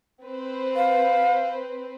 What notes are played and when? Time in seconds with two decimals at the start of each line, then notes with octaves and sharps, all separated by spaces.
0.25 C4 B4 C5
0.76 F5